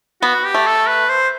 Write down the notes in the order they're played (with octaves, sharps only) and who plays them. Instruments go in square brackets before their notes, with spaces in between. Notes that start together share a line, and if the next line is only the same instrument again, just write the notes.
[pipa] B3 [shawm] F#4
[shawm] G4
[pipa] A3
[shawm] A4
B4
C5